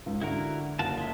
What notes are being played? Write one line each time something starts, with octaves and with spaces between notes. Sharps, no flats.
C#2 G#2
D3 E4 F#4 A#4
F#1 F4 F#4 A5
G#3 F4 E5